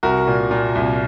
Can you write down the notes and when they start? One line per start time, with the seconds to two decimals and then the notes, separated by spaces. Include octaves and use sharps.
0.03 C2 F#4 A#4
0.27 A#2
0.51 A#2
0.75 C2